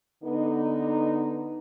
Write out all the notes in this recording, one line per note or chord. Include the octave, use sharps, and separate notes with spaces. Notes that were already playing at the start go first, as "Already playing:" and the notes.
D3 B3 D#4